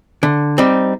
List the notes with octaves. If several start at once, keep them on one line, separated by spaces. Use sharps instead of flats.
D3
G3 C4 D#4